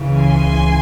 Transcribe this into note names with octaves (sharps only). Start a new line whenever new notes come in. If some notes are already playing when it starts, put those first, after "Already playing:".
Already playing: C#2 C#3 E3
G#5 C6